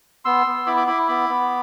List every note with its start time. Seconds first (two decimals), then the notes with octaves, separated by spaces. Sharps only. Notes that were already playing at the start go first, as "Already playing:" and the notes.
0.25 B3 C6 E6
0.47 B3
0.66 E4 B5 D6
0.77 B5 D6
0.87 E4 B5 D6
1.08 B3 B5 D6
1.29 B3